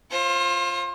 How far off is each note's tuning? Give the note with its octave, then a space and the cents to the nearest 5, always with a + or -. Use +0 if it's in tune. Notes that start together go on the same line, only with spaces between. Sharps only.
F4 +0 C5 +35